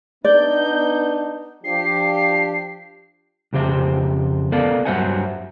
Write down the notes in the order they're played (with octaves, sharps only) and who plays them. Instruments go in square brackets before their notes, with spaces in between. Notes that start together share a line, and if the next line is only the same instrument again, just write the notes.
[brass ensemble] B3 D4 D#4 [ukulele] D5 [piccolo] G6
[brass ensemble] F3 D4 G4 [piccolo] C7
[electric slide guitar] F2 C#3 G4 C5 E5
B3 A4 A#4 D5 F5
G2 F#3 C5 E5 F#5 G#5